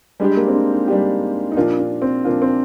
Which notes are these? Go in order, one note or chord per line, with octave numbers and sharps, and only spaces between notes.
G3 G#3 D4 G4
A#3
C4
D4
D#4
G3 D4 G4
D#4
A#2 F3 A#3 D4 F4
D4
C4
A#2 F3 A#3 D4 F4
C4